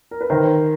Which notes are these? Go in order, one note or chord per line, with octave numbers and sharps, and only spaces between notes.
A#4
B4
D#3 A#4 C5